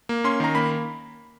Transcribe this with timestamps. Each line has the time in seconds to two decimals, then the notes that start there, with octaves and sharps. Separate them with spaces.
0.09 A#3
0.24 C#4 C6
0.40 D#3 A#5
0.55 A#3 B5